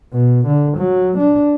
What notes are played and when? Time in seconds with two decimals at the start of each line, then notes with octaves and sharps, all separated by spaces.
0.13 B2
0.47 D3
0.77 F#3
1.18 D4